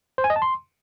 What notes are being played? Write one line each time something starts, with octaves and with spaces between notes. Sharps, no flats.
C5
G#5
D#5
A5
C6